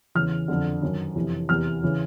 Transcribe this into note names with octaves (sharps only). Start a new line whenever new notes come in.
E2 C#3 E3 F6
F2 D3
F#2 D#3
F2 C3 E3
E2 C3 E3 F6
C#3 E3